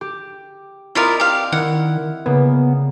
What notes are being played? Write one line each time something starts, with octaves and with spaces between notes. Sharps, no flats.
G4
C4 E4 F4 A#4 D5 D#5
G4 F5
D#3 E4 F#5
C#3 A#3 B3